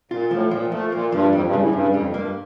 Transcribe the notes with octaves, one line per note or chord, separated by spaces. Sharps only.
A#2 F4
A2 F3
A#2 F3
F3 A3
A#2 A#3
G2 F3
F2 G3
G2
C#3
A2
G2 C#3
F2 G3
G2 A#3